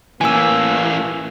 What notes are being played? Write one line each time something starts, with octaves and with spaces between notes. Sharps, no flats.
A2 E3 A#3 G#5 E6